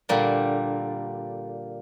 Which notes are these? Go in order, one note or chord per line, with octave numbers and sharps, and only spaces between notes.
A#2 D3 G3 A#3